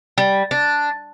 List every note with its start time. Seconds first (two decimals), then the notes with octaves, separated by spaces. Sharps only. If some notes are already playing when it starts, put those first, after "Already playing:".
0.18 G3
0.51 D4